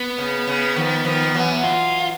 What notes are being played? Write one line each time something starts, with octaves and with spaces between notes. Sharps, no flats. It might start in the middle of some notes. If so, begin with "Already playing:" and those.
Already playing: B3
C#3
C#3
D#3 F3
D#3 F3
E3 F#3
F4